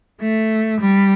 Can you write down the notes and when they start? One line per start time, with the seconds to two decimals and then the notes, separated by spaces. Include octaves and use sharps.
0.22 A3
0.81 G3